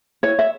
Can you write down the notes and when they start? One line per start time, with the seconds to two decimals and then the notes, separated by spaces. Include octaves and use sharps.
0.23 E4 C#5
0.39 E5